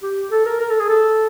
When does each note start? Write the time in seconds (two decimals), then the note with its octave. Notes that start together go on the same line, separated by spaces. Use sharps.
0.03 G4
0.31 A4
0.46 A#4
0.61 A#4
0.70 A4
0.80 G#4
0.89 A4